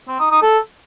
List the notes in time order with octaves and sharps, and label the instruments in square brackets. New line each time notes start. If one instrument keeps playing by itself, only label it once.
[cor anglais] C4
D#4
D#4
A4